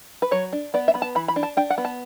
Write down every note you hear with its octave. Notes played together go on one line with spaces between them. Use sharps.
B4
F#3 C#5
D4
B3 D5
E5
B3 B5
A5
E3 B5
B5
D4
A5
D4 G5
F#5
B3
A5